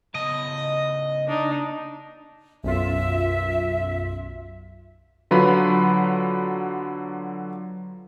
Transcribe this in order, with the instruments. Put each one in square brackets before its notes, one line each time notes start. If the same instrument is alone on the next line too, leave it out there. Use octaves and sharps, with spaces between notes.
[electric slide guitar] C#3 B3 A5 [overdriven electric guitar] D#5
[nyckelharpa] D4 D#4
[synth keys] B1 F#2 F4 [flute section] E5
[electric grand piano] D3 F#3 F4 B4 B5